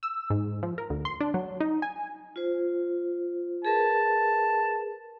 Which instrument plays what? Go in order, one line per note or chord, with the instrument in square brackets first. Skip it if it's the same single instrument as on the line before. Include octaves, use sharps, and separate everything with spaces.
[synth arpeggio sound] E6
G#2
F3
A#4
D2
C6
D4
F#3
D#4
G#5
[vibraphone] F4 C5
[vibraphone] G#4 A#4 B4 [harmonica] A5